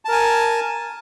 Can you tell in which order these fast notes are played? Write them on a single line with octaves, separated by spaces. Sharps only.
A5 A#4 G#5